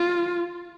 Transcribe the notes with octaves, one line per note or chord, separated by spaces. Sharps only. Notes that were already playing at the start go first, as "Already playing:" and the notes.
Already playing: F4